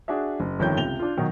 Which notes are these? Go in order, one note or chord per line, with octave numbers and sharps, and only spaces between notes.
D4 F#4 G#4 E5
F#1
G1 F2 D#3 C#5 G6
C#2 C3 F7 G7
D4 F4
B2 D#3 F#3 D#4